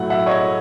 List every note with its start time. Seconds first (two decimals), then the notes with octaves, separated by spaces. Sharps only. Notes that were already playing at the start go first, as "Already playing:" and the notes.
Already playing: A2 F#3 A3 F#5
0.10 E5 F#5
0.26 C#5 D#5